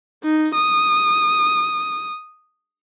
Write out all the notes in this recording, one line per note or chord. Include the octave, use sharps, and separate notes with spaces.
D#4
D#6